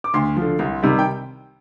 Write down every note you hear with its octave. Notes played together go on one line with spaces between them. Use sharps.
D6
D2 C6
D3 F3
C2
C3 D#3 G3
G5